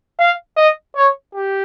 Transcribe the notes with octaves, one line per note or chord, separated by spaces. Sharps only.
F5
D#5
C#5
G4